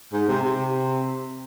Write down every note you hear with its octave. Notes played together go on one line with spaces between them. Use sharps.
G#2
C3
C3